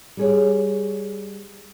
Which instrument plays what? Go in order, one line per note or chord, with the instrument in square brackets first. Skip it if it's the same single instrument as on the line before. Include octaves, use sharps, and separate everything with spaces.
[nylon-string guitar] G3 G#4 C#5